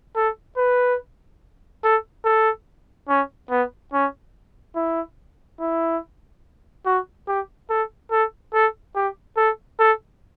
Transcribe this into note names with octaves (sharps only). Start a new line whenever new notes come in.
A4
B4
A4
A4
C#4
B3
C#4
E4
E4
F#4
G4
A4
A4
A4
G4
A4
A4